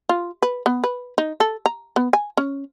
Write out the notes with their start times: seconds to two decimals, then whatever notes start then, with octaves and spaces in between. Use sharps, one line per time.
0.09 F4
0.42 B4
0.66 B3
0.84 B4
1.18 D#4
1.40 A4
1.66 A#5
1.96 B3
2.13 G#5
2.37 C#4